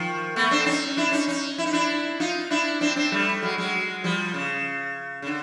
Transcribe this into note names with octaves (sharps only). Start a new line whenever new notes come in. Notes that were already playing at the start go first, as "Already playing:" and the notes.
Already playing: D#3 F3
A3 B3
C4 D4
C#4 D#4
D4 E4
C#4 D#4
C#4 D#4
E4
D#4
D4 E4
D#4 F4
D4 E4
C4 D4
C4 D4
G3 A3
F#3 G#3
F#3 G#3
F3 G3
C#3
C#3
D3